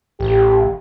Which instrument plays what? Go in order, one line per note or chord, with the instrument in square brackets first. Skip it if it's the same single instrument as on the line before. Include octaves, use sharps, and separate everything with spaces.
[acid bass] A1 [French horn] G4